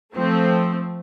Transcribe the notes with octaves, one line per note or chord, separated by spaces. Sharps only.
F3 A3 C4